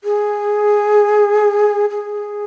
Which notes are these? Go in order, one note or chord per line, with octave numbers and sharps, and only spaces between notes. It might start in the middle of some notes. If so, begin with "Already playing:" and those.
G#4
G#4